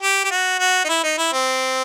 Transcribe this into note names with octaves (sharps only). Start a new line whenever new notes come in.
G4
G4
F#4
F#4
D#4
E4
D#4
E4
C4